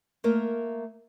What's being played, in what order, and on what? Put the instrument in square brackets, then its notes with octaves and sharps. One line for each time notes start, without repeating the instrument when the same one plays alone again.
[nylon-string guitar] A3 A#3 A#4 D#5